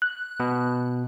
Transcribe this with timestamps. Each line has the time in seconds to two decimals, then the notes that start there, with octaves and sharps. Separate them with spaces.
0.02 F#6
0.40 B2